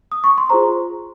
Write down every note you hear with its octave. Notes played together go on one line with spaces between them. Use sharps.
D#6
C#6
C6
F4 G#4 C5 A#5